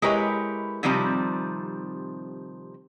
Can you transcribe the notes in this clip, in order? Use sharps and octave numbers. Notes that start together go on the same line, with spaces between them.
G#3 E4 G4 A#4 B4 C#5
C3 D#3 F3 G3 C4